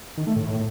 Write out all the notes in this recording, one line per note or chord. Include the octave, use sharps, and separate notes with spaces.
D#3
A3
A2